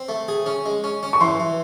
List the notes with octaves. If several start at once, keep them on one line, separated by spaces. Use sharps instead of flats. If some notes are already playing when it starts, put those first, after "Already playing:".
Already playing: C4
A3
G#4
C#4
G#3
C#4
C#4
C#6
E3 C6
E3